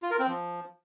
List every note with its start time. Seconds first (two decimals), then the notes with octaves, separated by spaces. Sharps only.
0.03 F4
0.11 A#4
0.19 C4
0.28 F3